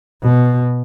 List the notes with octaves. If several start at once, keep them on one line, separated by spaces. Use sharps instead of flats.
B2